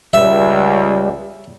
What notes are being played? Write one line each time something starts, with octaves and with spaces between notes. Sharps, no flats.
C#2 G3 E5